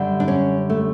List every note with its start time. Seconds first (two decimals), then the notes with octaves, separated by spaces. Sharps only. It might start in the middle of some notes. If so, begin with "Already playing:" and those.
Already playing: F#2 D3 G3
0.20 D4
0.28 C#4
0.70 A3